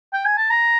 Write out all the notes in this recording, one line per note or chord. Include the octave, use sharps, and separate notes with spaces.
G5
G#5
A5
A#5